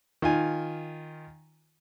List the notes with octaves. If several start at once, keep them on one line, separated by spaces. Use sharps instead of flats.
D#3 F4 G#5